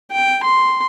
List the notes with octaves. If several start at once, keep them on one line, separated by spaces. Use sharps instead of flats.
G5
C6